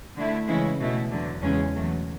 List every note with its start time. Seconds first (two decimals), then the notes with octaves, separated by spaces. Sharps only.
0.16 D3 A3 E4
0.47 C#3 E3 G#3 C#4 E4
0.79 B2 A3 E4
1.11 E2 D3 F#3
1.42 E2 C#3 G#3 C#4
1.74 E2 B2 F#3 A3